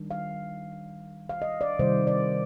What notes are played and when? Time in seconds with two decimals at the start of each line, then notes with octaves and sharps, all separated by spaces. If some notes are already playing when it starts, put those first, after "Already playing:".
Already playing: D#3 G3 D4
0.11 F5
1.29 F5
1.42 D#5
1.61 D5
1.79 C3 D#3 G3 C5
2.07 D5